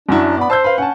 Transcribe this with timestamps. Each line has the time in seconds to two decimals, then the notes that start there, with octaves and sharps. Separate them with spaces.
0.09 F#2 F#3 D4 E4
0.37 B3 D5 B5
0.50 C5 A5 E6 G6
0.64 B4 F5
0.78 C#4 F#5 A5